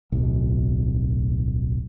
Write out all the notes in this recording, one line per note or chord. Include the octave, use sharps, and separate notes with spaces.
D1 B1